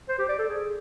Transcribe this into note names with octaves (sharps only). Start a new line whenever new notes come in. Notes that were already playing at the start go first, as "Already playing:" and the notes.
C5
G4
D5
A4
G#4